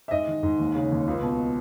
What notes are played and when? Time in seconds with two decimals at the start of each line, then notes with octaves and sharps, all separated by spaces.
0.08 E5
0.11 G#2 D#5
0.27 D#3
0.43 G#2
0.59 D#2
0.75 C#3
0.91 D#2
1.07 C#2
1.22 B2